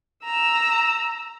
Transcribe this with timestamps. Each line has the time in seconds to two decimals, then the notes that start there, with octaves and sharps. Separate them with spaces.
0.24 A#5 E6